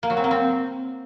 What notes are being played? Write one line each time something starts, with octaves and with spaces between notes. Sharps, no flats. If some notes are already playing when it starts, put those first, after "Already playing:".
A#3
F#3
C4
A#3
C4